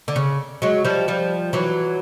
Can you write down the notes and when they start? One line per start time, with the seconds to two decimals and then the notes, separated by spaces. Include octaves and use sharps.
0.08 D3
0.16 C#3
0.62 F#3 G#3
0.85 F3 G3
1.08 F3 G3
1.53 E3 F#3